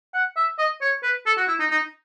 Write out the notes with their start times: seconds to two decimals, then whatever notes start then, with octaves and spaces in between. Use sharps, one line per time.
0.14 F#5
0.36 E5
0.59 D#5
0.81 C#5
1.03 B4
1.26 A4
1.37 F#4
1.47 E4
1.59 D#4
1.70 D#4